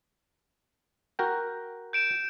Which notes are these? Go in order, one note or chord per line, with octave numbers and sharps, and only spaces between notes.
F#4 A#4 G5
G6 D7 E7